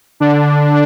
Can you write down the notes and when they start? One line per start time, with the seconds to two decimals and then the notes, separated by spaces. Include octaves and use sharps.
0.20 D3 D4